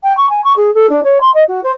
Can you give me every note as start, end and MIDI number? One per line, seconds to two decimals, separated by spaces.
0.04 0.15 79
0.17 0.27 85
0.30 0.44 80
0.44 0.53 85
0.57 0.73 68
0.74 0.90 69
0.90 1.01 62
1.04 1.19 73
1.21 1.33 84
1.34 1.44 75
1.48 1.61 66
1.64 1.71 72